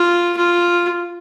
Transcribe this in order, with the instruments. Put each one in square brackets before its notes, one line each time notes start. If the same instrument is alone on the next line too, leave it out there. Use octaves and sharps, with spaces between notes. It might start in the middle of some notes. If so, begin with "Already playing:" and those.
Already playing: [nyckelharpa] F4
F4